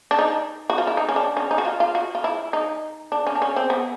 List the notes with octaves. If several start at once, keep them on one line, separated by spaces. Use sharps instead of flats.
D4
D#4
F#4
F4
E4
D#4
C#4
D4
C#4
D#4
F#4
F4
F4
F#4
F4
E4
D#4
D4
C#4
D4
C#4
C4
B3